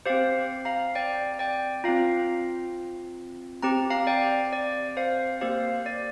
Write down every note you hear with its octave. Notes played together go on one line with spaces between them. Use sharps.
C4 G4 C5 F5
F5 A#5
D5 G5
D5 G5
C4 F4 F5 A#5
C4 G4 A#5
F5 A#5
D5 G5
D5
C5 F5
A#3 G4 C5 F5
D5